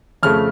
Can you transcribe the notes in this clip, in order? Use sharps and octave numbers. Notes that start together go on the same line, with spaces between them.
F2 C#3 A3 F6